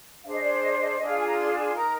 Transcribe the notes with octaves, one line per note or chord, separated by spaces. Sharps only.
D4 G#4 C5 F5
D#5
D5
D5
D#5
D5
D#5
D5
D4 F4 G#4 D#5
F5
G#5
A#5
C6
G#5
C6
D#4 A#4 A#5